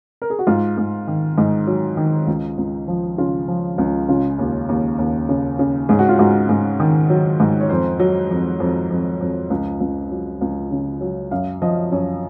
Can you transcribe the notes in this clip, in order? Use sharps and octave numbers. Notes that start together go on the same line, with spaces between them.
A#4
G#4
F#4
G#2 F4
G#2
D#3
G#2 D#4
F#3
D#3
C#2
C#2
F3
C#3 F4
F3
C#2
C#3 F4
D#2
D#2
D#2
C#3
C#3
G#2 G#4
F#4
F4
G#2 F#4
G#2
D#3
F#3
G#2
C#5
F2 C5
F#3
F2
F2
F2
F2
C#2
C#2
F#3
C#2
C#3
F#3
F#2 F5
F3 D#5
F#2 C#5